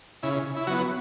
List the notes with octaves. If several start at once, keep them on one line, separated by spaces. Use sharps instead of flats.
C#3 E4
E4
F#3 B3 F#4